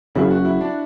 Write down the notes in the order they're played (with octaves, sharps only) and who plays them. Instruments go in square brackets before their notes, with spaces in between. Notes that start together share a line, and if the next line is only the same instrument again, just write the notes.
[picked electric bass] F#1 F#2 C#3 [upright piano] E4
[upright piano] F#4
E4
D4